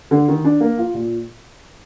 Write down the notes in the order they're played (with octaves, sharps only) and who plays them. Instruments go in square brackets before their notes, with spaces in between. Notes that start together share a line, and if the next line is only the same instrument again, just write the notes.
[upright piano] D3
D#3
D4
A#3
F4
A#2